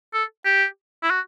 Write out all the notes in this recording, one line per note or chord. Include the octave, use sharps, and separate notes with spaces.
A4
G4
E4
F#4